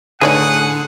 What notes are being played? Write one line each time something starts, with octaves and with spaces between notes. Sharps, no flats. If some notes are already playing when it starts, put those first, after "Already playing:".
A2 D3 D#4 G#4 C#5 D5 F#5